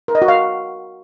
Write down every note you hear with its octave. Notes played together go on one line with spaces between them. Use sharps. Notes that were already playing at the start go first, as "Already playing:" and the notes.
A#4
D#5
F#4
F5